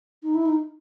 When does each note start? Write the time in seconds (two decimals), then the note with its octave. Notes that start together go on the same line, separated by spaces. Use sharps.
0.23 D#4
0.34 E4
0.46 D#4